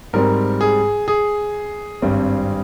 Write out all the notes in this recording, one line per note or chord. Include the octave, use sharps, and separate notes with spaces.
G#2 G3 C4 A#4
G#4
G#4
G#1 G2 G3 C4